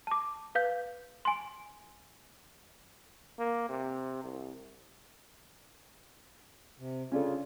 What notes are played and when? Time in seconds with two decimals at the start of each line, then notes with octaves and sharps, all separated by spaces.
0.07 A5 D6
0.55 B4 F5 G6
1.25 G#5 C6
3.39 A#3
3.69 C3
4.23 C2
6.79 C3
7.12 C#3 C#4 D4 F4 A4